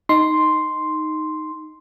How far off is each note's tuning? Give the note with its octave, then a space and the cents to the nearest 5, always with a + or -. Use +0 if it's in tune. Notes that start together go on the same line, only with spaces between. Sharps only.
D#4 +0 C6 +0